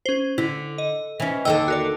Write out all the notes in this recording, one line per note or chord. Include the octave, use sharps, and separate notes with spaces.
C#4 C5
D3 E4
D#5
E3 C#4
D#2 D3 A4 D#5 G5 E6
F#4 A#4 D5